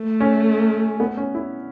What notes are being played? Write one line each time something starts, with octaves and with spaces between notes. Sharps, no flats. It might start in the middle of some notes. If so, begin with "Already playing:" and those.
Already playing: A3
C#4
B3
C#4
E4